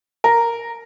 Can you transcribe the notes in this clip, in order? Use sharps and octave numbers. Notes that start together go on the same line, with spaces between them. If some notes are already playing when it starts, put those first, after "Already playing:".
A#4